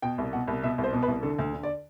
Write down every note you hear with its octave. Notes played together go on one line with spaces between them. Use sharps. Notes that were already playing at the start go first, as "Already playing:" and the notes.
B2 G5
C2
B2 F#5
C2
B2 E5
C2
C5
B2
B4
C2
D3 A4
D2
D3
D5